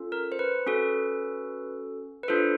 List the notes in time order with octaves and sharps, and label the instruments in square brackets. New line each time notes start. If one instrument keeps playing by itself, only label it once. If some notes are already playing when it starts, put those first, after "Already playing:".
Already playing: [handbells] C#4 F4 A4
A#4
C5
B4
C#4 F#4 A4
B4
D4 F4 A4 C5